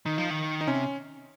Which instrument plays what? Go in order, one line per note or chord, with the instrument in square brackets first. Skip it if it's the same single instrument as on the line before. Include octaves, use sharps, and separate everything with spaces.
[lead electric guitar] D#3 [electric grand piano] D#4
[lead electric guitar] F3
D#3
[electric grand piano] D#4
[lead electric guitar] C3 [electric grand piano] C#4